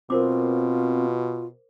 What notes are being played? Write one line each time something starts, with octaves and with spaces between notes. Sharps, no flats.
B2 C4 F4 A#4 C5 D6